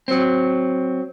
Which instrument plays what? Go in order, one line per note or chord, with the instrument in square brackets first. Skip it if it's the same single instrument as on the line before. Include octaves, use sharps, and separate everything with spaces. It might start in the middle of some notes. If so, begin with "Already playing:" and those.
[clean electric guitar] F#3 C4